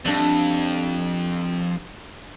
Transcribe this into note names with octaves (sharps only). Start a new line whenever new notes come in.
F2 G3 D4 E5